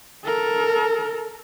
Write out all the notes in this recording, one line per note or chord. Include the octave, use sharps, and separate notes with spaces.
A4 A#4